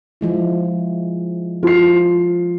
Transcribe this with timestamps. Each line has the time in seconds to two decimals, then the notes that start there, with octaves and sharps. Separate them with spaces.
0.21 F3 G#3 E4
1.63 F3 F4 C7